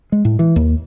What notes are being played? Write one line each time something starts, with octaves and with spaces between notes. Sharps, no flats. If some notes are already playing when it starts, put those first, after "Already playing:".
G#3
A2
E3
D#2